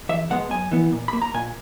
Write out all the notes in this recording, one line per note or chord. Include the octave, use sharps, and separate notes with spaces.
E2 E5
B2 G#3 B3 F#5
F#2 G#5
E3 B3
A#2
A#3 B5
A#5
A#2 G#5